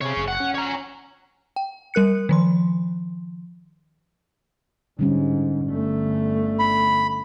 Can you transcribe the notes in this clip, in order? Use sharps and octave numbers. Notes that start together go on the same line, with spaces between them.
C3 G#4 C#5
F#1
F#5
C#4
C#5 A#5
G5
G3 A#4 F#6 C#7
D#3 F3 C6
G#2 D3 G3 C#4
G1 A3
B5